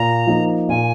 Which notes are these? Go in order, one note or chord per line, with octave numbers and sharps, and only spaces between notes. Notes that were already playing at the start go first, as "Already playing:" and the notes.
Already playing: A#2 A#5
F3 A#3 D#4
A#2 G#5